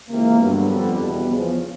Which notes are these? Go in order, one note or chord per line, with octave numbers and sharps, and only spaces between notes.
C#2 C3 E3 A#3
G2 D3 F#3 B3
F2 D3 G3
E2 B2 G3
E2 C#3 F3